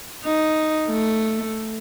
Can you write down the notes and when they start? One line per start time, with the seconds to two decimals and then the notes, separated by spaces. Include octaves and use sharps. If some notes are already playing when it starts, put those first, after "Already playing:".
0.25 D#4
0.88 A3